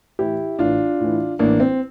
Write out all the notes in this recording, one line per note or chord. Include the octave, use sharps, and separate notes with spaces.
A2 E3 E4 G4
A1 D4 F4
A2 E3
A1 A#3 D4
C4